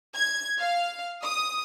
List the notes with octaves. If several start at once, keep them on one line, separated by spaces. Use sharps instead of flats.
G#6
F5
D#6